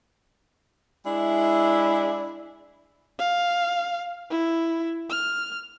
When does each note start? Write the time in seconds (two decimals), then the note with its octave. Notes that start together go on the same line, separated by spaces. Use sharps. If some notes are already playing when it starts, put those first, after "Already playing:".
1.06 G#3 D4 E4
3.19 F5
4.30 E4
5.10 F6